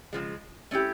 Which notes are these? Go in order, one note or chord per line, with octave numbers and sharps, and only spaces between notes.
C#3 F3 G#3
A3 C#4 E4 G4